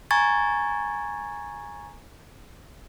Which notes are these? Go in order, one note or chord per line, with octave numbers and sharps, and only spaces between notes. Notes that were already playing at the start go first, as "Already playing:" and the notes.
G#5 A#5 C#6 G#6 A6